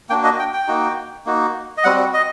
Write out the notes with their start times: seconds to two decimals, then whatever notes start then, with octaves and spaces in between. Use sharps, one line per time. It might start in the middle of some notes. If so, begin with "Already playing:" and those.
0.09 A#3 D4 F#4 G5
0.24 D#5
0.39 G5
0.53 G5
0.68 A#3 D#4 F#4
1.26 A#3 D#4 F#4
1.77 D#5
1.84 G3 C4 F#4 F#5
2.13 D#5